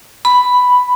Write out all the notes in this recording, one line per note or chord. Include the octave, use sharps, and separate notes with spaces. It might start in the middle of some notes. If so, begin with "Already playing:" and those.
B5